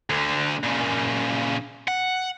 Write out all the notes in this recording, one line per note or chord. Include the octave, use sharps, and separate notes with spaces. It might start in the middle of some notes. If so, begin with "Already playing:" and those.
D2 D3
A#2 C#3
F#5